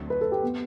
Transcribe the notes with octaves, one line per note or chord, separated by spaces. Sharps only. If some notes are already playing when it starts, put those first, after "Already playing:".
Already playing: D2 D3 F#3 A3 C4
B4
A4
G4
B3